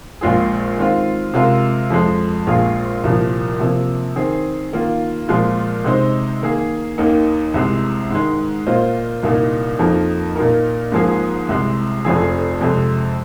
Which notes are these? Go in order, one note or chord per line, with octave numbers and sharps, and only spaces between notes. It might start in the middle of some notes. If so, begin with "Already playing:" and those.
A#1 A#2 G#3 F4 G#4
D#3 G#3 C4 F4
C3 G#3 F4 A#4
F2 F3 G#3
A#1 A#2 G#3 F4 G#4
C2 A#2 F3
C3 F3 A#3
D#3 C4 G#4
D#3 A#3 F4
A#2 F3 G#3 F4
C3 G#3 D#4 C5
D#3 A#3 G#4
D#2 D#3 A#3 D#4
C2 C3 G#3
G#2 D#3 G#3
A#2 A#3 F4 C5 D#5
C2 A#2 A#3 D#4
F2 F3 A#3 D#4 A#4
A#2 A#3 D#4 A#4
G#2 F3 A#3 G#4
C2 C3 G#3
F1 F2 F3 C4 G#4
F2 C3 G#3